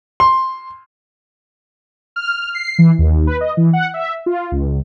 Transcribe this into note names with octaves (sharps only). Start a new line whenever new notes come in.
C6
F6
C7
E3
D#2
B4
D#5
E3
F#5
E5
F4
C#2